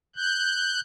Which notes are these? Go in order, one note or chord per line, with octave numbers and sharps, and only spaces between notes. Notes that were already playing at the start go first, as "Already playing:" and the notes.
F#6 G6